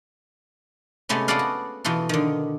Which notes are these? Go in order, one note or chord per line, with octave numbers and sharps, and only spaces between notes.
C3 G#3 A3 B3 C#4
B3 F#4 G#4 A4 D5 F5
F#4
B2 E3 F4 A4
D3 D#3